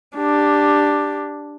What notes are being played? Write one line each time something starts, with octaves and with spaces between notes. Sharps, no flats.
D4 G4